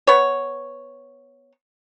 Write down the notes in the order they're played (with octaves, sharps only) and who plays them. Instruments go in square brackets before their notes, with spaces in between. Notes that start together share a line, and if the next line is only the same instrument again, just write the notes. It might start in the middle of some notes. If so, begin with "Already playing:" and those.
[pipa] B3 C#5